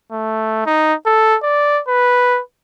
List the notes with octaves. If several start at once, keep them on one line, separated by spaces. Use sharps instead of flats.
A3
D#4
A4
D5
B4